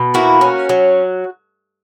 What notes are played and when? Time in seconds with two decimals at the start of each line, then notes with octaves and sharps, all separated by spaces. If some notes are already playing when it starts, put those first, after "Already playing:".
Already playing: B2
0.14 A#3 E4 F#4
0.41 C#4
0.69 F#3